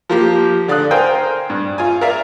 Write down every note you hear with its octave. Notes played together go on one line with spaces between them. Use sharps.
F3 A#3 G4
D3 D5 F5 D#6 F#6
A#4 C5 F5 G5 G#5
G2
F4 G#5
A#4 D5 E5 F5